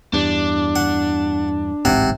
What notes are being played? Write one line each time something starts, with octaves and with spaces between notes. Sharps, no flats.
E2 G2 D4
F#5
D1 A1 G#2 C3 F#5